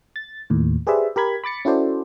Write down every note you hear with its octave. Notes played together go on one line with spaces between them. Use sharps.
A6
D#2 A2
G4 G#4 B4 C5 D5 E5
G4 A#4 B5 G#6
B5 D6 A6 C#7
C#4 E4 F#4 A4 C5 D5